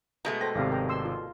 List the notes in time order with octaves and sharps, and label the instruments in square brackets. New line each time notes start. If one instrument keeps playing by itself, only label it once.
[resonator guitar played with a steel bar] B2 G#3 A3 [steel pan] D#5 A#5
[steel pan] A4 C5 G5 [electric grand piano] A#6
[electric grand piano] G#1 C3 [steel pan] B4 D5 F5
[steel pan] A#4 G5 A#5
C6 E6
F4